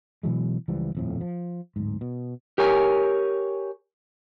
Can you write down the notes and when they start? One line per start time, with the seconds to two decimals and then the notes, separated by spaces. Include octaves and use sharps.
0.23 B2 E3 F#3 G#3
0.68 C#2 E3 F3 G3
0.95 D#1 F2 A2
1.21 F3
1.76 D1 G#2
2.01 B2
2.58 G4 A#4 C#5 G#5